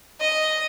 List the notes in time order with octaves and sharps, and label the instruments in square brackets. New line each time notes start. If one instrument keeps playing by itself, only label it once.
[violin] D#5